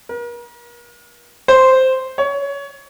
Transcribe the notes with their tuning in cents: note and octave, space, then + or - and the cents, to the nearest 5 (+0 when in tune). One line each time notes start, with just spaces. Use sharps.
A#4 +40
C5 -5
C#5 +20